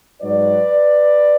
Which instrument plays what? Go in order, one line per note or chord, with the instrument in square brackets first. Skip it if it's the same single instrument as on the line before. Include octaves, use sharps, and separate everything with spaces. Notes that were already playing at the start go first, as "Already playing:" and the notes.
[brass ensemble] G#2 F#3 B4 D5